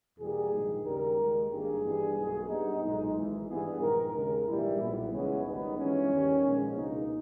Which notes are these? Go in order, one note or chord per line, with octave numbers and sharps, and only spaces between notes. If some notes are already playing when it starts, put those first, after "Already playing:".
E2 B2 G3 A#3 G#4
A#1 G#2 D#3
D#2 C#3 G3 A#4
D#2 D#3 G#3
G#1 G2 D#3 A#3 G#4
G2 E3 G3 B3
B1 B2 A#3
G2 G3 B3 D#4
B1 A#2 G#3 D#4
G#1 G#2 E3 G#3
G2 E3 G3 B3 G#4
A#1 G#2 D#3 A#4
D#2 C#3 G#3 A#4
A#1 G#2 E3 G3 A#3 E4
B1 A#2 G3 B3
C#2 C#3 E3 G#3 B3 C#4
G#1 G#2 D#3 G3 B3 D#4
G2 E3 G#3 B3 C#4
D#2 D#3 G3 A#3
A#1 A#2 G#3 B3
C#2 B2 A#3 D#4